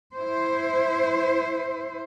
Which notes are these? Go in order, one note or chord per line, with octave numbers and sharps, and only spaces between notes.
E4 C5